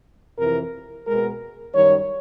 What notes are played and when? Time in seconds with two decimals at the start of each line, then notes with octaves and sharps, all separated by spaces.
0.37 F2 C3 E3 A#4
1.06 B2 G#3 B3 A#4
1.75 F#2 D#3 G3 C#5